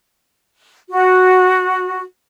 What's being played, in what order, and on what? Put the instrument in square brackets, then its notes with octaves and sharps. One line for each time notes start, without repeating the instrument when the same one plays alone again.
[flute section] F#4